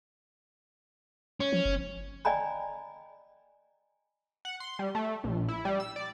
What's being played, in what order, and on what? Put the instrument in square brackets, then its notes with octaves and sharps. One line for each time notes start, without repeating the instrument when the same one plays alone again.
[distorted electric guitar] C#4
[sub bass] F3
F#1
[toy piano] D5 D#5 G5 G#5 A#5 B5
[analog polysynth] F#5
C6
G3
A3
A#1
E4
G3
E6
D5